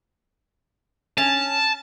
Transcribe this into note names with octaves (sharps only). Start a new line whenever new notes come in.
C#4 A5